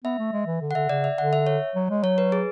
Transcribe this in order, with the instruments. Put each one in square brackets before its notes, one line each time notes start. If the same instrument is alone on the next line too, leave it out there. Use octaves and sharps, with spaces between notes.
[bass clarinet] B3 [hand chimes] E5
[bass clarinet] A3
G#3
E3
D3
[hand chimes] F#5
[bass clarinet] D3 [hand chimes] E5
[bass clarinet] C#3 [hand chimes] D5
[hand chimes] E5
[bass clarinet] D3 [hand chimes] F#5
[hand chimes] E5
C#5
[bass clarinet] F#3
G#3
[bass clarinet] F#3 [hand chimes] C#5
[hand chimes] B4
G#4